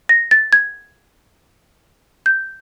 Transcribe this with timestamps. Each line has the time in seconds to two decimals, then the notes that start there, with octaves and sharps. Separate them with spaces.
0.09 A#6
0.31 A6
0.53 G#6
2.26 G6